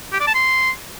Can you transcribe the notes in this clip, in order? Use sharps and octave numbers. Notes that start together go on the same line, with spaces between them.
G4
D5
A5
C6